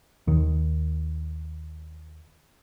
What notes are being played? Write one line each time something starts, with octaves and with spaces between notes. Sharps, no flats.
D#2 D#3